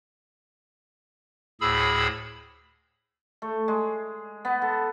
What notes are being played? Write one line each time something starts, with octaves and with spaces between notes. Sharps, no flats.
D2 A2 G#4 B5 E6
A3
G#3
B3
A4